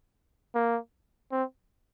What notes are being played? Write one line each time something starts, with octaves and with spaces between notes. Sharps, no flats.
A#3
C4